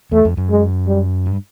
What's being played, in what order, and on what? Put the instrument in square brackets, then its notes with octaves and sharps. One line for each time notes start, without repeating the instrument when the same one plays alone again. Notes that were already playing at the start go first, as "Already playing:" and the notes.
[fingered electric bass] E2 [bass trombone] A3
[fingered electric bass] F2
F#2
[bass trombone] G#3
G3
[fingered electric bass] G2